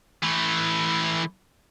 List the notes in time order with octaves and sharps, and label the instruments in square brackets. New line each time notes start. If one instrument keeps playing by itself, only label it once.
[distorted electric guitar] E3 A3